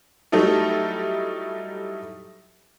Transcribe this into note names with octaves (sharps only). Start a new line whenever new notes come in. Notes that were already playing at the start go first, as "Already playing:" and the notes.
F#3 G3 A3 D#4 E4 A4